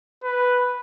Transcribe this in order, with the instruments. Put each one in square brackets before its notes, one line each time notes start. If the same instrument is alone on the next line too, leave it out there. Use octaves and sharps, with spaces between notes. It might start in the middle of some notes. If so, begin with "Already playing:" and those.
[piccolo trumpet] B4